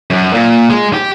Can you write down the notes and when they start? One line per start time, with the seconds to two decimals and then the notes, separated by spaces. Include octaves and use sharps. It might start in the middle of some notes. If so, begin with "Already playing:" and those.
0.10 F#2
0.33 A#2
0.69 G#3
0.94 G4